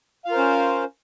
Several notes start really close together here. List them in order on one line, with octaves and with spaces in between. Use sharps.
F5 F4 A#4 C5 C#4